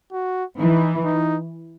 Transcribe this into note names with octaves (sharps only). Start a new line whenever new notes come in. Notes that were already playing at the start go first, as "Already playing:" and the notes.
F#4
E3 D#4
D#4